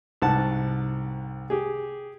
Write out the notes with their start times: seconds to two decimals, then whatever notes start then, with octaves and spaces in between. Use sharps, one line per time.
0.22 C2 G#2 F#5 A5
1.50 G4 G#4